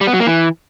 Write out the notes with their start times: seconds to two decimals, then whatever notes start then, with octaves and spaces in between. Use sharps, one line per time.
0.01 G3
0.07 B3
0.14 F#3
0.20 A#3
0.26 E3